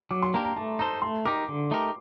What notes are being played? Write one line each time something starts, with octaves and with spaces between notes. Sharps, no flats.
F#3 D6
C6
A#3 D4 G4 A#4 A#5
A#5
A3 A5
D#4 A4 C5 A#5
A3 C6
D#4 G4 A#4 D6
D3
A3 D#4 G4 A#4